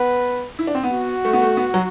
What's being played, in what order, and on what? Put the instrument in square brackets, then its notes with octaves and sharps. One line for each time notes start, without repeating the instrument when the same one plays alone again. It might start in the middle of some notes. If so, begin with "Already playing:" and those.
Already playing: [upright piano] B3 [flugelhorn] B4
[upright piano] E4
D4
C4
B3
[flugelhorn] F#4
[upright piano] A3
B3
A3
B3
F#3